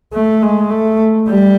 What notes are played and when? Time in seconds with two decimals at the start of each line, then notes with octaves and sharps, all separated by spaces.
0.13 A3
0.42 G#3
0.70 A3
1.27 G3